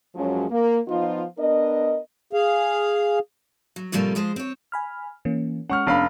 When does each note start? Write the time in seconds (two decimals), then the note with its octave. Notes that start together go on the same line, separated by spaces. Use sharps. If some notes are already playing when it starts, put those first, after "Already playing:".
0.16 F#2 F3 F#3 G#3 C#4
0.51 A#3
0.88 F3 B3 D#4 F4
1.39 B3 D4 A#4 D#5
2.33 G#4 F5
3.76 F#3
3.92 A2 C3 F3 G3 A3 A#3
4.15 F3 G#3 C5
4.36 C4 C#5
4.72 G#5 B5 F6
5.25 E3 A#3 C#4
5.70 G#3 C#4 F#5 C#6 F6
5.87 F1 B3 C#4 D4 F5 B5